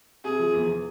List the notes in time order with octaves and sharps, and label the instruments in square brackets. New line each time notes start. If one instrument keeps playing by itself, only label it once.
[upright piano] C3 [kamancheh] G#4
[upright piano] F3
E2